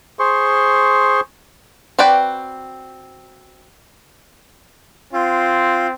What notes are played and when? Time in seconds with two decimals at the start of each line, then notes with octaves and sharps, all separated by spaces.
0.19 G#4 C5 C6 C#6
1.99 C4 F#4 B4 D5 G5
5.13 C4 F4